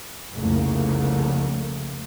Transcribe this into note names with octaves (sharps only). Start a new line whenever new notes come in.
F1 C2 F2 C#3 A3 A#3